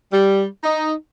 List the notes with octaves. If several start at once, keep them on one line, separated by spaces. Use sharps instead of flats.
G3
D#4